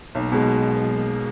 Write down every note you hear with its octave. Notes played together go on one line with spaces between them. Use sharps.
B1 F#3 A#3
B2 G#3